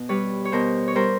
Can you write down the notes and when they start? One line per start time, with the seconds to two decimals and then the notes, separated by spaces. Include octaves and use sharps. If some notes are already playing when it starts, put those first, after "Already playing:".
Already playing: B2
0.09 G3 B4 C#5
0.45 C#5
0.52 B2 A#4 C5
0.88 C#5
0.95 G3 A#4 C5